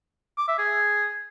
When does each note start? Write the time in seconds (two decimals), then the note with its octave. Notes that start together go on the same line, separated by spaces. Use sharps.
0.38 D6
0.48 E5
0.58 G#4